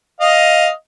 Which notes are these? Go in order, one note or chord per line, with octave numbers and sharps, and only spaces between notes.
D#5 F5